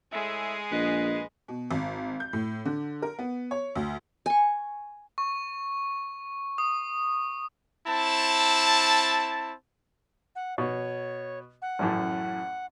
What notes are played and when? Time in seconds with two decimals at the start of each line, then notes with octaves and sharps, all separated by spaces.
0.12 A2 G#3 G#4 E5
0.71 A#1 B3 B4 D#5
1.48 B2
1.71 G#1
2.20 G6
2.33 A2
2.65 D3
3.02 A#4
3.19 B3
3.51 C#5
3.75 D2
4.26 G#5 C#6
5.18 C#6
6.58 D#6
7.87 C4 E4 A5
10.36 F#5
10.58 B2 C#5
11.62 F#5
11.79 A1 F#2 A2